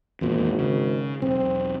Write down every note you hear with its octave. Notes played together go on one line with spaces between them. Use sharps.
G#1 E2 A#2
C#3
E1 B1 C4